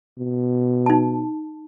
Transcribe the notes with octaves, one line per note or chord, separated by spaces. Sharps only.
B2
D#4 A5